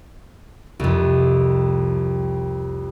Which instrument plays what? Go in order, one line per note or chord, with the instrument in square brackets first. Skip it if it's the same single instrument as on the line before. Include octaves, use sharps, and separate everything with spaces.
[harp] C2 F2